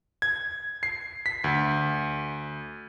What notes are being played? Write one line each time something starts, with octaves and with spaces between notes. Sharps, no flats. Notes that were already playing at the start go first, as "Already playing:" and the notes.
G#6
C7
B6
D2